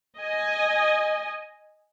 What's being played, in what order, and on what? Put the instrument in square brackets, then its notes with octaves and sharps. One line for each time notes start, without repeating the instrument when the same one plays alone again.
[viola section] D#5 G#5